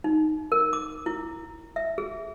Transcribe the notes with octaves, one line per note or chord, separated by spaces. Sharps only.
D#4
A#4
D6
E4
E5
G#4